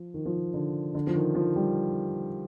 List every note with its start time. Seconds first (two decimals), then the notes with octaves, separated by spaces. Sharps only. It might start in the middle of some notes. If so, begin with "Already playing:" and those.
Already playing: F3
0.14 D#3
0.26 F3
0.36 D#3
0.54 D3
0.95 D3
1.07 F3
1.15 D#3
1.35 F3
1.56 G3